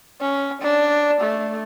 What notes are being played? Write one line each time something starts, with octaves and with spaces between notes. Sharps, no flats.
C#4
D4
A3